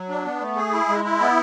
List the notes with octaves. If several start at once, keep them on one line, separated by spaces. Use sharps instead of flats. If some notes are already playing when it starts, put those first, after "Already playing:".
Already playing: F#3
D4
B3
A3
G#4
E4
G#3
E4
B3